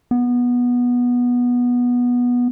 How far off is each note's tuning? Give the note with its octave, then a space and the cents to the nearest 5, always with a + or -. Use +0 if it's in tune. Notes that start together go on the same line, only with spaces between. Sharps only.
B3 -15